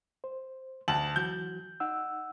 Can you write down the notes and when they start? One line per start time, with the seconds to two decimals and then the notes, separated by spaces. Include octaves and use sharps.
0.24 C5
0.88 D2 A5 F#7
1.16 E3 F#3 F#4 G6
1.80 D#4 F#5 E6